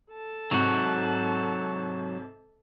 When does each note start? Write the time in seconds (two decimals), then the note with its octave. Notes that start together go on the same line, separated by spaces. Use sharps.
0.12 A4 A5
0.51 G#2 C3 F#3 F#4